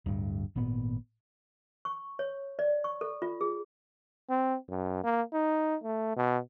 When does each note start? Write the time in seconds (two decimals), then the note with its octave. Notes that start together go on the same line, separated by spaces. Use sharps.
0.06 D1 G2
0.56 G#1 A#2 B3
1.85 C#6
2.19 C#5
2.59 D5
2.84 C#6
3.01 A4
3.22 F4
3.41 G#4
4.30 C4
4.70 F#2
5.04 A#3
5.33 D#4
5.84 A3
6.17 B2